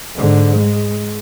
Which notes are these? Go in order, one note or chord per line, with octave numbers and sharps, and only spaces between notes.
G#2 D3
G#3